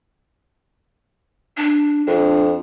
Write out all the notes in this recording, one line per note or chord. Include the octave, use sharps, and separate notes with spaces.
D4
F2 D4